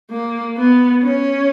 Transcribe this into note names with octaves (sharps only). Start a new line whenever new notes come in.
A#3
B3
C#4